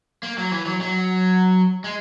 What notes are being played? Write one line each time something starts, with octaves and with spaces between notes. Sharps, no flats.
A#3
F#3
E3
F#3
F#3
G#3